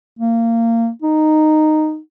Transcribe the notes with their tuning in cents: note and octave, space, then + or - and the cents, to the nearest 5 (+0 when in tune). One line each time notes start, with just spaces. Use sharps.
A#3 -25
D#4 -10